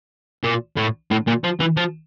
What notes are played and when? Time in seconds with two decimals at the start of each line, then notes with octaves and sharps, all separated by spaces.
0.44 A#2
0.77 A2
1.11 A2
1.27 A#2
1.44 F3
1.60 E3
1.77 F3